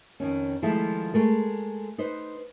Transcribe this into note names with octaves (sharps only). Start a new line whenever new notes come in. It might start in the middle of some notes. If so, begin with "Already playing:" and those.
F2 D#3 C#4
D#3 F3 G#3 A3 E4 F4
G#3 A3 A#4
D#4 B4 C5